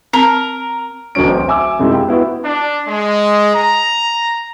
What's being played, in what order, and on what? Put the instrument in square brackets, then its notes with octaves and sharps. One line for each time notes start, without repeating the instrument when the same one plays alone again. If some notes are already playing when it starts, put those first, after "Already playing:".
[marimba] C4 A5 A#5 [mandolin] A#4
[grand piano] D1 B1 E2 B2 C#4 D7
C4
E5 G#5 D6 E6
F#2 C3 G#3 D#4 E4
F4 G4
B3 E4 F#4 B4
[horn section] D4
G#3
A#5